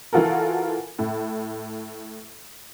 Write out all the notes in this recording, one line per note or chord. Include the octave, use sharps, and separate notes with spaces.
E3 F4 F#4 A4 A#4
A2